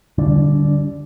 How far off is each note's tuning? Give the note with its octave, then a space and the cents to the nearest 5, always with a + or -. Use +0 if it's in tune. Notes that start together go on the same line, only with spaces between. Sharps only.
D3 +0 G3 -5 D4 -40